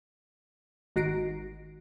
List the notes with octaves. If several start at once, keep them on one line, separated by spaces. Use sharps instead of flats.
G#1 D#3 F#4 A#6 C7 D7